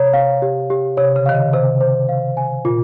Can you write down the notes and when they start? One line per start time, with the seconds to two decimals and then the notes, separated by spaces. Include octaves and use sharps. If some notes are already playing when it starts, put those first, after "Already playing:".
Already playing: C3 C#5 A#5
0.13 F5
0.42 G4
0.70 G4
0.97 C3 C#5
1.16 C#3
1.26 D#3 F5
1.35 C#3
1.53 C3 C5
1.81 C5
2.09 F5
2.37 G#5
2.65 A#2 F4